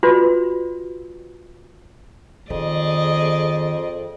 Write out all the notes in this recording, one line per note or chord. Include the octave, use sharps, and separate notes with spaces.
F4 F#4 B4 D5 C6
F2 D#3 G#4 D5 D#5